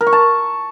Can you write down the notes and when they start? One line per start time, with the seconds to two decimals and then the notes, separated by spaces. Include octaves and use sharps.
0.01 A#4
0.07 C#6
0.13 A5